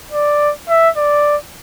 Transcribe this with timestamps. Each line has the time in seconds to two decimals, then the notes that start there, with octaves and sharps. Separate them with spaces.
0.12 D5
0.69 E5
0.97 D5